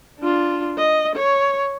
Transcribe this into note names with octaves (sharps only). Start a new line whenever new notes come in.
D4 F4
D#5
C#5